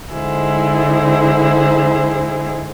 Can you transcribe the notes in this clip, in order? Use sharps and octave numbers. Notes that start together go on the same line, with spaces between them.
D3 G#3 D#4 E4 G#4 C5